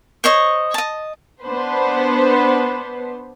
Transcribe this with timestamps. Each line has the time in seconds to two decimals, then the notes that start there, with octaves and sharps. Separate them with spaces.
0.24 C5 C#5 D#5 C#6
0.74 D#5 A5
1.43 B3 D4 B4 C5